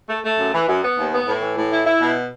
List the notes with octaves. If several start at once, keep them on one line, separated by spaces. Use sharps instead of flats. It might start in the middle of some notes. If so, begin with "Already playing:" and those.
A3
A3
F#2
E3
F#2
B3
D#2
B3
A2
E3
A2
E4
E4
B2